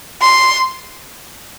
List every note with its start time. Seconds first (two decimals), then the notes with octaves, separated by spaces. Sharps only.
0.22 C6